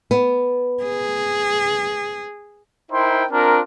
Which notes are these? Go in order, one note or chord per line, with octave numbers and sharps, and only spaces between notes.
B3
G#4
D#4 E4 A#4 C5 G5 C6
C4 D4 F4 A#4